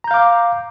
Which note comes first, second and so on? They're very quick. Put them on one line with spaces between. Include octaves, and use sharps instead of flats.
A#5 G6 F5 D6